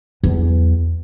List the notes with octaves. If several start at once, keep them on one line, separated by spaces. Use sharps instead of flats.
E2 F#3